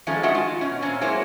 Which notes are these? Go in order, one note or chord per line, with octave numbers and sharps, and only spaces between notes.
D#3 F3 G#3 A3 C#4
G#3 D4 F#4 E5 F#5
F4
B2 C#4
A#2 C4 C#4
F#3 G#3 A#3 E4 C5 C#5